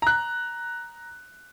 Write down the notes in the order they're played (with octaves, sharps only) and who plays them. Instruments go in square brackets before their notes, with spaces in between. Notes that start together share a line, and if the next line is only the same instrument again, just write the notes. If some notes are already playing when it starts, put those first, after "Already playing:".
[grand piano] A#5 F#6